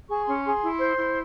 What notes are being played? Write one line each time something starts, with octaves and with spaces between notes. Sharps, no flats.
G#4 C#6
C#4 C6
G#4 C6
E4
C5
E4